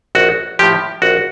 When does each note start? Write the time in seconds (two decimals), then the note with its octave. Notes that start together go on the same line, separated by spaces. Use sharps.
0.15 A#1 F#4
0.59 A2 F3 G4
1.02 A#1 F#4